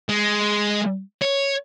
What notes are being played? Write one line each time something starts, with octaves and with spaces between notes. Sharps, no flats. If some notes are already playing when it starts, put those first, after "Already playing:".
G#3
C#5